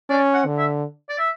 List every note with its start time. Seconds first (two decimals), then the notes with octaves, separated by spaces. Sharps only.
0.10 C#4 D5
0.34 F#5
0.46 D3
0.58 E5
1.09 D5
1.19 E5